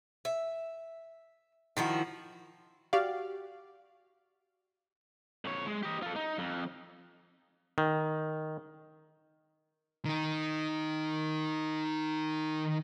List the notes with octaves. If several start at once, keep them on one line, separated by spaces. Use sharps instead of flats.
E5
D#3 F3 E4 F#4
F#4 G4 D5 F5
F2 C#5
G#3
G4 D#5
F4 A4
D#4
F2
D#3
D#3 D#4